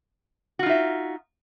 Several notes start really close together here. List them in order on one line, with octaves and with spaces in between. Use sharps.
F#4 F4 D#4 E5